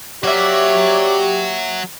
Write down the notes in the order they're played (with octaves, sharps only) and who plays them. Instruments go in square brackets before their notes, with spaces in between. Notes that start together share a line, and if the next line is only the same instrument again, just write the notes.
[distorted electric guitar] F#3 F#4 [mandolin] A#3 E5 [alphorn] G4 [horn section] C#5 D5